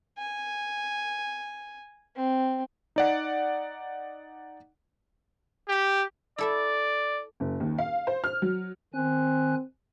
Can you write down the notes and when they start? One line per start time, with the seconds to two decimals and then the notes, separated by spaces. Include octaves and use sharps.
0.18 G#5
2.16 C4
2.96 D#4 D5 F#5
5.69 G4
6.38 E4 A4 D5 E5
7.40 F#1
7.60 D#2
7.78 F5
8.07 C5
8.24 F6
8.42 F#3
8.94 D#3 C4 G#5 F#6